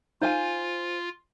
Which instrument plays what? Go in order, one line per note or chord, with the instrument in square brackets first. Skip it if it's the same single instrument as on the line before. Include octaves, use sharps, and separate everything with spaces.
[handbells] D#4 [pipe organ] F4 [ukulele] C5 F5 G#5